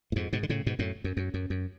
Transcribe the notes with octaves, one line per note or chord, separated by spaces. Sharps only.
A2
F2 G#2
G#2 B2
D3
A2 C#3
G#2 B2
F#2 A2
F#2
F#2
F#2
F#2